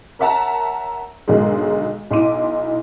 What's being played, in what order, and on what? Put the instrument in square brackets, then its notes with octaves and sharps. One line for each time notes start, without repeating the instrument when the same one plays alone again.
[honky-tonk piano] A#4 C#5 E5 F#5 A5 A#5
B1 G#2 D3 D#3 F#3 G#3
B1 E4 C6 D6 D#7